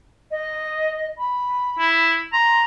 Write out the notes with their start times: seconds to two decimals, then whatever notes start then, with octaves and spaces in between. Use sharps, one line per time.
0.31 D#5
1.18 B5
1.79 E4
2.33 A#5 C6